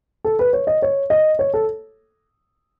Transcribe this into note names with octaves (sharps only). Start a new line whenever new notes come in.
A4
B4
C#5
D#5
C#5
D#5
C#5
A4